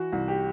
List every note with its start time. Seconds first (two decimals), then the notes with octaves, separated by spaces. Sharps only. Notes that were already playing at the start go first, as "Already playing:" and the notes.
Already playing: E3 F#4
0.12 C2
0.28 G4